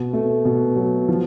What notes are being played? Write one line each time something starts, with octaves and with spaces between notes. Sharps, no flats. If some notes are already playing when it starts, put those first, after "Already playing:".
Already playing: B2
A3
B2
F#3
F3